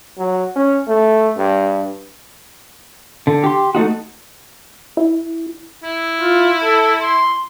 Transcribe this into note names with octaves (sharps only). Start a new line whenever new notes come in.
F#3
C#4
A3
G2
D3
G4 C6
A3 C4 D#4 F#4
E4
E4
F4
A4
C6